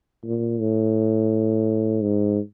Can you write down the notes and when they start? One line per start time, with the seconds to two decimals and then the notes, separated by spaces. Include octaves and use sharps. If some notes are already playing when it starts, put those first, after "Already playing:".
0.24 A#2
0.60 A2
2.02 G#2